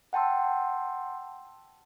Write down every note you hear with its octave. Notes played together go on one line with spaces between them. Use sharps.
F#5 G5 A5 C6 E6